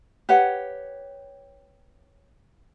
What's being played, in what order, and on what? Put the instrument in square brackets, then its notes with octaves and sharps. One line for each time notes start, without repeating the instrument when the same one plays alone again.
[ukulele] G4 B4 C#5 F#5